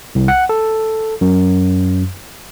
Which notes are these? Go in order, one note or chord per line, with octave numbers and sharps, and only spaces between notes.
C2
F#5
A4
F#2